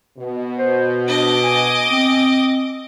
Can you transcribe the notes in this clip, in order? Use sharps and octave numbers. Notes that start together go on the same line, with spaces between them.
B2
C5
D4 D#5 D6
G#5
C4